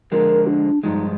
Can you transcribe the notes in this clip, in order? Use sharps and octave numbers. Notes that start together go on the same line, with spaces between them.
D3 F3 G#3 A#4
D4
G2 F3 G#3 D#4